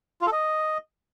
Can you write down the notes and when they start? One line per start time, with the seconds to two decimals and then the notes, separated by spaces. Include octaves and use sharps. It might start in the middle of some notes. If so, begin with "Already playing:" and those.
0.21 F4
0.27 A4
0.32 D#5